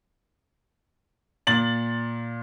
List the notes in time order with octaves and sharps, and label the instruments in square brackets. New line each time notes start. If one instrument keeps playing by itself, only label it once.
[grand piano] A#2 A6 F#7